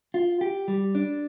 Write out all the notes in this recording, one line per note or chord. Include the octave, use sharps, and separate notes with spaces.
F4
G4
G3
D4